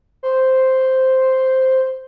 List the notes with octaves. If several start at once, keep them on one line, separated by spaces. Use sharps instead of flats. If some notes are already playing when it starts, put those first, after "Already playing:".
C5